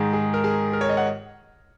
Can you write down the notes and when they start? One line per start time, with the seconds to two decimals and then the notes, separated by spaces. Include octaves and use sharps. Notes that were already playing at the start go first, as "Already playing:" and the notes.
Already playing: G#2 D#3 G#4
0.13 G#4
0.34 A#4
0.44 G#4
0.73 A#4
0.81 C#5
0.89 D#5
0.97 F#5